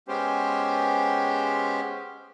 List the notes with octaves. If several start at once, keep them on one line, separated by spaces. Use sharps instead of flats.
G#3 B3 C#4 G4 C5